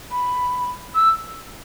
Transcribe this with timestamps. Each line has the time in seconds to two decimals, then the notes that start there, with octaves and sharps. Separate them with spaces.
0.11 B5
0.95 E6